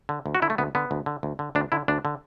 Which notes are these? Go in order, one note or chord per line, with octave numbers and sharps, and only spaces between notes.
D3
D2
F#4
D3 E4
A3
D2 B3
D3 B3
D2
D3
D2
D3
D2 D4
D3 E4
D2 D4
D3